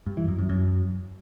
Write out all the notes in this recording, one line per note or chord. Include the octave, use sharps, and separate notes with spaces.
G2
E3
F#2
F#2
F#2